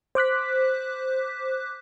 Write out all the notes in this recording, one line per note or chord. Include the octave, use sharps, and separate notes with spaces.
C5 D6 F#6 B6